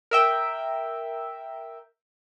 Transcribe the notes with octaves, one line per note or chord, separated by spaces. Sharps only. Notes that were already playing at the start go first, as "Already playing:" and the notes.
A#4 E5 G5